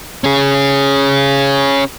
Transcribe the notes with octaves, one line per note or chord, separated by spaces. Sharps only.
C#4 G#4